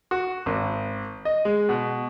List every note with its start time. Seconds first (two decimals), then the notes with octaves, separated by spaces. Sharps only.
0.11 F#4
0.46 G#1
1.25 D#5
1.45 G#3
1.69 B2